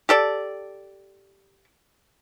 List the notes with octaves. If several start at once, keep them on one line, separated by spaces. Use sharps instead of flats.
G4 A4 D5